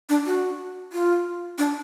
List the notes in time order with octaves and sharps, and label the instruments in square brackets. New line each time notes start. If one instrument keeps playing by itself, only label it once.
[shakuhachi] D4
F#4
F4
D4